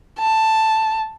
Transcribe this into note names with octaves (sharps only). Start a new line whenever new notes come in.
A5